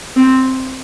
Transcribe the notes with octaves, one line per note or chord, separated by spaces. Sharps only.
C4